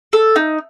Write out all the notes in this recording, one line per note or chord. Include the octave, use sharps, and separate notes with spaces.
A4
D#4